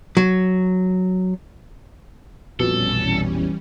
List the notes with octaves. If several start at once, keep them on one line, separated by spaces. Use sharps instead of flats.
F#3
A#1 F2 B2 E3 G3 C#4 A4